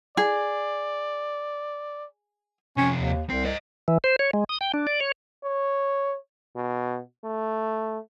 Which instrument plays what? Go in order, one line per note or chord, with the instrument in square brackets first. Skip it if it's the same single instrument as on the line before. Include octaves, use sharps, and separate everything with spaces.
[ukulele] G#4 [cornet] D5
[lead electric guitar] F2 C3 [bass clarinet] C#4
[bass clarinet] D#2
[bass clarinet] C2 [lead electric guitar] C4
[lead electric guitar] C5 D#5
[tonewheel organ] E3
C5
C#5
G#3
D#6
G5
D4
D5
C#5
[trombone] C#5
B2
A3